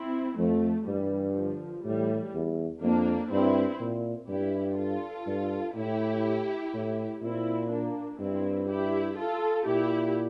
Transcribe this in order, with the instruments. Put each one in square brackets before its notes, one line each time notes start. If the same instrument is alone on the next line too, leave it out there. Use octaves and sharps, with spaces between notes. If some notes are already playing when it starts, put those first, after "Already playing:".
Already playing: [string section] C4 E4
[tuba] F2 [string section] F3 A3
[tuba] G2 [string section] E3 G3
[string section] D3 F3
[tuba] A2 [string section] E3 G3
[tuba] E2
[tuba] F2 [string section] A#3 D4
[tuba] G2 [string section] C4 E4
[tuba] A#2
[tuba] G2 [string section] E4 G4
[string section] F4 A4
[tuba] G2
[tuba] A2 [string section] E4 G4
[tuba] A2
[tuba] A#2 [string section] C4 E4
[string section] A#3 D4
[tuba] G2 [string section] C4 E4
[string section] E4 G4
F4 A4
[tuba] A#2 [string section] E4 G4